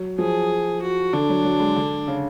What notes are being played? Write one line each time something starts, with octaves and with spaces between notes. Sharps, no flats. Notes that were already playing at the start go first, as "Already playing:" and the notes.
Already playing: F#3
F3 G#4
F#4
D3 D4
F#3
F#3
G#3
D3
C#3